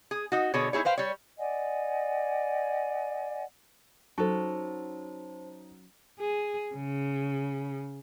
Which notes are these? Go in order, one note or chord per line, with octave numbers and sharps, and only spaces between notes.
G#4
D#4 F#4
B2 D3 G#4 C#5
D#4 E4 G#4 C#5
B4 C5 F5 G5
G3 C#5
D5 D#5 F#5 G#5
F#3 C#4 D#4 F#4 A4 C5 A5
G#4
C#3